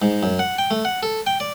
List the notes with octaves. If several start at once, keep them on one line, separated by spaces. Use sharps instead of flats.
G#2
F#2
F#5
G5
A3
F#5
A4
G5
D5